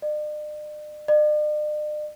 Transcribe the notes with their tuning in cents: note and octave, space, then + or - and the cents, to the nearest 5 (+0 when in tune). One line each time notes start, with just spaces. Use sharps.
D5 +45
D5 +45